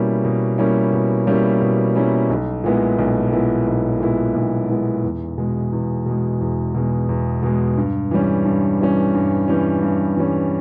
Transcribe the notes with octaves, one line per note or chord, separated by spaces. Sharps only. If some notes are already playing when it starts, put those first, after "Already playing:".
Already playing: B2 G3 A#3 C#4 E4
B2
G3 A#3 C#4 E4
B2
G3 A#3 C#4 E4
B2
G3 A#3 C#4 E4
B1
A#2 G#3 B3 E4
B1
A#2 G#3 B3 E4
B1
A#2 G#3 B3 E4
B1
A#2 G#3 B3 E4
E2
B2 G#3
E2
B2 G#3
E2
B2 G#3
E2
B2 G#3
G2
E3 G3 C#4
G2
E3 G3 C#4
G2
E3 G3 C#4
G2
E3 G3 C#4